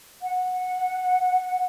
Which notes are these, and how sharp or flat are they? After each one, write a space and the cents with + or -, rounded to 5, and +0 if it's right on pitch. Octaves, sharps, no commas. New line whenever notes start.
F#5 -15